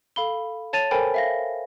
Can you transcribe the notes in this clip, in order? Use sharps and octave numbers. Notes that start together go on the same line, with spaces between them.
A4 F5 B5 G7
C#5 A5 A6 D#7 F7
A4 A#4 C5 G5 G#5 B5
E5 F5 A#6